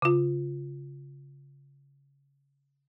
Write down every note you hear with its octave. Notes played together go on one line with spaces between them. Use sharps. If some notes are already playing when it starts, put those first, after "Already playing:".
C#3 F4